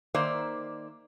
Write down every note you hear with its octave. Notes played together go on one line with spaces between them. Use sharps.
D#3 A#3 C5 D5 E5